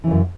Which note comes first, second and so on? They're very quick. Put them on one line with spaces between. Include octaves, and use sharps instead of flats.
E3 C#3 F#2